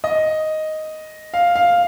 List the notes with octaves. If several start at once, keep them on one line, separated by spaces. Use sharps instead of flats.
D#5
F5
F5